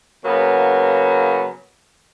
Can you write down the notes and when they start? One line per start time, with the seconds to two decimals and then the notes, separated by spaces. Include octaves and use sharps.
0.25 C#3 F#3 A#3 B3